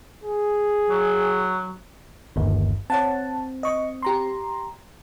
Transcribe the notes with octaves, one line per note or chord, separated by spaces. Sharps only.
G#4
F#3
G1 D#2
C4 C#5 F#5 A5
D#5 C#6
G4 A#5 C6